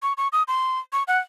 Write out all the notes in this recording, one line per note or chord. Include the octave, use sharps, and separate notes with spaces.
C#6
C#6
D#6
C6
C#6
F#5